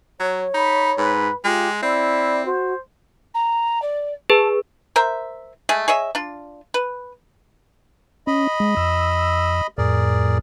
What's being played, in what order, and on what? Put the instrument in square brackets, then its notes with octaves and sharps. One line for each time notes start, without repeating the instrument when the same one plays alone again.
[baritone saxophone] F#3 [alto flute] C#5
[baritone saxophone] D#4 [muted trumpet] B5
[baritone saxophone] G#2 [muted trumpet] B4
[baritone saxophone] G#3 [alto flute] F4 [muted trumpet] G4
[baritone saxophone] C4 [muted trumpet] E4 [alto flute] D5
[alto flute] F#4 [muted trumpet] C5
[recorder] A#5
D5
[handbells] G#4 B4 [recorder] A5
[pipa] A#4 C5 E5
G#3 A3 G#4
G#4 C#5 D#5 E5
D4 F4
B4
[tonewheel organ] C#4 [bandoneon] D#5 B5
[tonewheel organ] G#3
F2 E6
[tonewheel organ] F2 A2 [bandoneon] G#4 A#4 D5